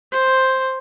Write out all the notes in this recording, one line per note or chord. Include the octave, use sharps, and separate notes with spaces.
C5